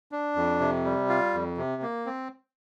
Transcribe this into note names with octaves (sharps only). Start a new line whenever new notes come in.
D4
F2
C3
G3
F4
F2
C3
A#3
C4